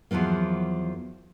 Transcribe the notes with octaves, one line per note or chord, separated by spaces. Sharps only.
E2 G#2 F3 F#3 A#3